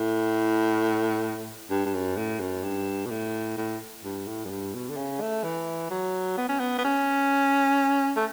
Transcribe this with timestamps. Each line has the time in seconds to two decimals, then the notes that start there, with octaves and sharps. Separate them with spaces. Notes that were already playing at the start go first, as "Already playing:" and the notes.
Already playing: A2
1.70 G2
1.86 G2
1.94 F#2
2.17 A2
2.40 F#2
2.64 G2
3.05 B2
3.10 A2
3.57 A2
4.04 G2
4.27 A2
4.46 F#2
4.50 G2
4.74 B2
4.90 D3
4.97 C#3
5.21 A3
5.44 E3
5.90 F#3
6.37 B3
6.49 C#4
6.59 B3
6.78 B3
6.84 C#4
8.16 A3